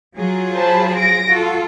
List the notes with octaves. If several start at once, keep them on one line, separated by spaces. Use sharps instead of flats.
F#3 F4 G#4
C5 A5 B5
A#6 D7
F4 F#4 A4